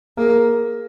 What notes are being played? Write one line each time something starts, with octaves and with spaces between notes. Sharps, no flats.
A#3 G#4 A#4